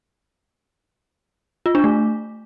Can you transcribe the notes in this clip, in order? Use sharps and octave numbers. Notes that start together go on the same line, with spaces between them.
F4
D4
A3